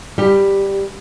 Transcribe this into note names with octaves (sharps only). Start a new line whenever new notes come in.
G3 G4